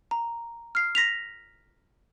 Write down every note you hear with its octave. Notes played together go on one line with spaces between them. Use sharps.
A#5
F6 C7
A#6 B6 F7